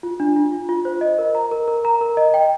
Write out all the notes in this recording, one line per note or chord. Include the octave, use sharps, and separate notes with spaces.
F4
D4
F4
F4
F4
C5
D#5
A#4
A#5
A#4
A#4
A#5
A#4
D#5
G5